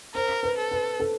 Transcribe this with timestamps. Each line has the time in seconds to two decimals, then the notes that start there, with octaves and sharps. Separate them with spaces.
0.14 A#4 C5
0.43 B4
0.58 A4
0.71 B4
1.00 A4